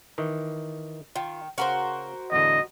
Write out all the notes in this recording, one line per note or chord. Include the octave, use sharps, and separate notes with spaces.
D#3 E3
D#3 F4
C#3 F#4 A#4 C5 F5
E2 A2 D3 D#5